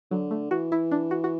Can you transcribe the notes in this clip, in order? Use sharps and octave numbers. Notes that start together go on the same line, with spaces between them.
D3 F#3
A3
E3 F#4
E4
D4
F#4
F#4